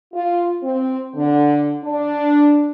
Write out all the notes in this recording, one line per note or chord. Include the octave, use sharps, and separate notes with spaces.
F4
C4
D3
D4